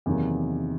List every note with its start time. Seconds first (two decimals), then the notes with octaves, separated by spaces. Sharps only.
0.06 E2 C3 D#3 F#3 A#3